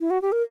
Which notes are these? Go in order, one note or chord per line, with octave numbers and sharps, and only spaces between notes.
E4
F#4
G4
A#4